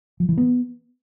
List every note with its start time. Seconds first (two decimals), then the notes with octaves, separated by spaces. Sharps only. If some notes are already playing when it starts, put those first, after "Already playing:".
0.20 F3
0.29 E3
0.37 B3